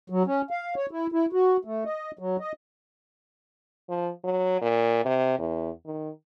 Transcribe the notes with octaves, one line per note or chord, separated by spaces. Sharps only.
F#3
C#4
F5
C#5
E4
E4
F#4
A3
D#5
F#3
D#5
F3
F#3
A#2
C3
E2
D#3